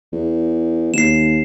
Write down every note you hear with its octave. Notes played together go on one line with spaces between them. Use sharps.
E2
D#2 C7 E7